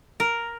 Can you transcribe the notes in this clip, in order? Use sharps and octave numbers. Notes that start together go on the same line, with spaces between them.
A#4